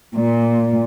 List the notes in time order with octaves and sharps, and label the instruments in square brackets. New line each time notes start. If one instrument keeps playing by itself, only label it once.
[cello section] A#2